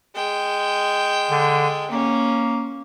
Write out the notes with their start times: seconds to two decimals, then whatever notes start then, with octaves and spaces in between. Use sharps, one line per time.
0.15 G#3 G5
1.31 D3
1.90 A#3 C#4